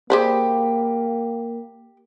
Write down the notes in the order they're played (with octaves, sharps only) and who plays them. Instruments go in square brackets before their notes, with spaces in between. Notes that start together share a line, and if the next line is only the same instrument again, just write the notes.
[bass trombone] A#3 [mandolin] G4 B5 [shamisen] G#4 C5 D5